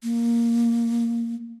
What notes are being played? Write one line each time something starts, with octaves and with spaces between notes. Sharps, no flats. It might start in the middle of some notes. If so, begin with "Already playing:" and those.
A#3